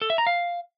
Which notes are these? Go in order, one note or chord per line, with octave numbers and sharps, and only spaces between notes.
A4
E5
A#5
F5